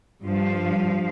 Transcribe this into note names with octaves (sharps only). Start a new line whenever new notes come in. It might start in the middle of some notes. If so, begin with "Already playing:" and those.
G2 F3 F5